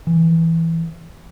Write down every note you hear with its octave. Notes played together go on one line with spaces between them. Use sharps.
E3